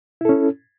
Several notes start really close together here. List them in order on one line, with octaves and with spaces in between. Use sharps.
E4 A4 C#4